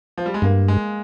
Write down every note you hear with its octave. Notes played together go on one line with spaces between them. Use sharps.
F3
G3
G#3
G2 A#3
G#3